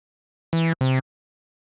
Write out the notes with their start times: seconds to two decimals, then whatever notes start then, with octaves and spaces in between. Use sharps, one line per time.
0.53 E3
0.81 C3